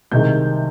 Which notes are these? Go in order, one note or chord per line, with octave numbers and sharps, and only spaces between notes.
C2 C3 D#3 G#3 G6